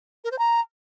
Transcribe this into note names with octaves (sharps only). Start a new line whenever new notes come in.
A#4
C5
A#5